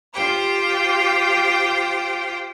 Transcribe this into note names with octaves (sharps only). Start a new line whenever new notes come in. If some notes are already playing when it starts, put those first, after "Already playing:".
F4 G4 C5 G5